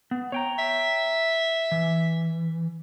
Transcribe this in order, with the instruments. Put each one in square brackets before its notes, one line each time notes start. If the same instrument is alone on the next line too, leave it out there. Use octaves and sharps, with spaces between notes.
[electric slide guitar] B3
C#5 G5 A#5
[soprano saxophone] E5
[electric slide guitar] E3